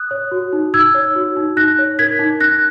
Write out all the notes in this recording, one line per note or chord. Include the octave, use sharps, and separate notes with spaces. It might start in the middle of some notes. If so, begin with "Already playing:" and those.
Already playing: D#6 F#6
C#5
F#4
D#4
D#4 E6 G#6
C#5
F#4
D#4
D#4 F#6 A#6
C#5
A#4 G#6 B6
D#4
D#4 F#6 A#6